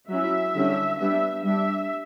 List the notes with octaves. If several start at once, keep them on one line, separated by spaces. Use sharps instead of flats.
F#3 C#4 E4 E5
D3 G3 C#4
G3 B3 D4 E5
G3 D4 E5